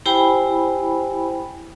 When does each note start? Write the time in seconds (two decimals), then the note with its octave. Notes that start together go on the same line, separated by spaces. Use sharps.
0.06 E4 G4 C5 G5 G#5 B5